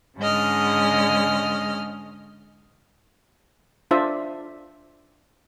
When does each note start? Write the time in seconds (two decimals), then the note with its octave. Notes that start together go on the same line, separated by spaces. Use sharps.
0.18 G#2 D3 G#3 C#4 D#5 F6
3.91 D4 F4 C5 D5 E5